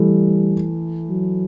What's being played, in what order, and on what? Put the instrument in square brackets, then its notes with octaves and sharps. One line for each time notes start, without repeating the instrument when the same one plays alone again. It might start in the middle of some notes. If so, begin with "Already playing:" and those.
Already playing: [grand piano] E3 A3 [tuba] G3
[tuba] F#3